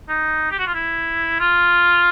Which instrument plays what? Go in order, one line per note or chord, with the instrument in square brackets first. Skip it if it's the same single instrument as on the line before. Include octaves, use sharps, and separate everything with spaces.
[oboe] D#4
G4
F#4
F4
E4
F4